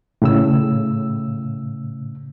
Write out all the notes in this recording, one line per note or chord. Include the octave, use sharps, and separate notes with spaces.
A2 C#3 E6